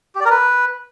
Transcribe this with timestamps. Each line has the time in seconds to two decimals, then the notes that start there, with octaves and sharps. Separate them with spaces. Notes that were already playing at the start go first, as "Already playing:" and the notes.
0.15 G4
0.20 D5
0.25 A#4
0.30 B4